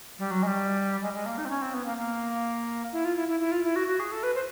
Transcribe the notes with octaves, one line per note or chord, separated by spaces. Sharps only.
G3
F#3
G#3
G3
G#3
G#3
A#3
D#4
C4
C#4
C4
B3
A#3
A#3
E4
F4
E4
E4
E4
F4
E4
F#4
F#4
G#4
A4
B4
C5